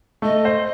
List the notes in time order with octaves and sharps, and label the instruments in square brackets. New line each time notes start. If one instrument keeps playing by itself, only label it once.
[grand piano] A3 [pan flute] D#5
[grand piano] C5